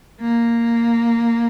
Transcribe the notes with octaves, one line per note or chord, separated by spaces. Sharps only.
A#3